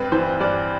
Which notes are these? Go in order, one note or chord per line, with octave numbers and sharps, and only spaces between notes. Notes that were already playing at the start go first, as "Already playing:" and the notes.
Already playing: G2 C4 B4
E3 C5
G2 D5